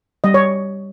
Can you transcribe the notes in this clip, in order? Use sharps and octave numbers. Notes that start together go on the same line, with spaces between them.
G3 D#5
C#5